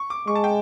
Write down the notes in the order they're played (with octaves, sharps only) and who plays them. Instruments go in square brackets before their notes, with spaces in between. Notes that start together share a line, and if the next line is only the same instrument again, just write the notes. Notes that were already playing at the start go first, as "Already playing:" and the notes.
Already playing: [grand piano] C#6
D6
[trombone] G#3 [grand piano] C#6
[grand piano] A5
G5